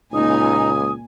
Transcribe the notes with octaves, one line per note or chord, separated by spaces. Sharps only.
C#2 A#2 D#4 G#5 D#6